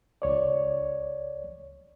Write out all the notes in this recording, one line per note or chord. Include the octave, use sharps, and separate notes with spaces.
C#2 C#5 D5